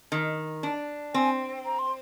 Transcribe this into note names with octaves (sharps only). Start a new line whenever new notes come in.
D#3
D4
C4 G#5
A#5
C6